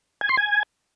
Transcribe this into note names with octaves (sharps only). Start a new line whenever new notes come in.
G#5
C6
G#5